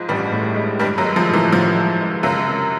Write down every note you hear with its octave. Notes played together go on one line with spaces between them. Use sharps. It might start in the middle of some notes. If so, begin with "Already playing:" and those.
Already playing: G#2 F3 G#3
A1 G2 G3
A2
G#3
G2 G3 G#3
F#2 F#3
G#3
F3
A2
E3
A1 F3
G#3
G#3
C#2 F#2 F#3
C3